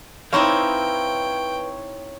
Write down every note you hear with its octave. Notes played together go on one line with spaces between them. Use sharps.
C4 D#4 E4 B4 C#5 F5 G5